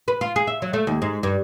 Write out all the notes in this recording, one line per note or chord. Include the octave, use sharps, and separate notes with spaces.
B4
F4
G#4
E5
F#3
A3
D#2
G#2
G2